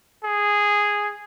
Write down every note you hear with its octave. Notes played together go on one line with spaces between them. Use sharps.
G#4